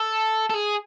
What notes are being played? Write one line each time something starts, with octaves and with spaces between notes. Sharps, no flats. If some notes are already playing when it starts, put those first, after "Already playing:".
Already playing: A4
A4
G#4